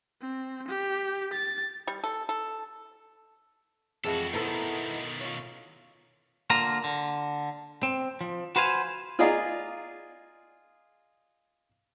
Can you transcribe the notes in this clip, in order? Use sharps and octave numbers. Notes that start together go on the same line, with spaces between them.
C4
G4
A6
G3
A4
A4
F2 E3 G#3 A3 F#4 A4
B2 D#3 B3 D#4 E4 A4 C5
C#4 E4 F4
D3 A#3 F4 A#5
D3
C4
F3
F#4 B4 C5 F5 G#5
F4 G#4 D5 D#5 F5 A#5